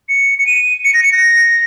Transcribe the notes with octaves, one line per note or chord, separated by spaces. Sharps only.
C#7
C#7
D#7
C#7
A#6
C#7
A#6